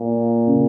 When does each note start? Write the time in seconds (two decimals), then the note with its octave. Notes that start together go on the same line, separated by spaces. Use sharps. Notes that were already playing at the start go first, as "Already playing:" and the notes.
Already playing: A#2
0.47 C#3